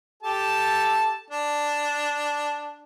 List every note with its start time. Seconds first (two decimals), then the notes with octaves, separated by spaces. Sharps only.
0.23 G4 A4 A5
1.30 D4